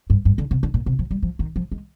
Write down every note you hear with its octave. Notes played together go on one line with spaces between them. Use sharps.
G2
G2
D3
C3
D3
A#2
C3
F3
G3
F3
D#3
F3
G#3